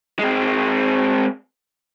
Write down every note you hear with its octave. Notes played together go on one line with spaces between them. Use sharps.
G#3 C4